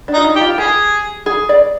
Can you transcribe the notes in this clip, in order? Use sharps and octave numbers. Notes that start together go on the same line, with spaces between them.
D4
D#4
F4
D#4
G4
F4
G4 G#4
G#4
D5